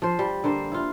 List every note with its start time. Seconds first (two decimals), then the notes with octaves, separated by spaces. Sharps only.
0.02 F3 C5
0.19 G3
0.44 D3 A#3 C5
0.72 E4 F4